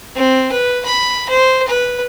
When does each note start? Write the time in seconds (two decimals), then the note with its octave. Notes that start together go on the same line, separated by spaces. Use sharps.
0.16 C4
0.52 B4
0.85 B5
1.29 C5
1.68 B4